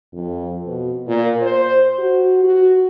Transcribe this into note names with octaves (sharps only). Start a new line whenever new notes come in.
F2
B2
A#2
C5
F#4
F#4